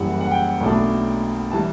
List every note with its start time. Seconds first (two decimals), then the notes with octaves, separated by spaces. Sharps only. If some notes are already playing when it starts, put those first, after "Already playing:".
Already playing: F#1 F#2 E3 G3 F#5
0.21 F#5
0.31 G5
0.61 B1 B2 A3 D4
1.52 E3 G3 A5